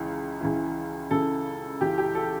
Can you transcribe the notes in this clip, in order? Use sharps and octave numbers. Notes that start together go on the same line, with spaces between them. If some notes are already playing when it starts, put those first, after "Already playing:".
Already playing: C#2 C#3 E3
C#2 C#3 E3
C#2 C#3 E3 A4
C#2 C#3 E3 G4
G4
A4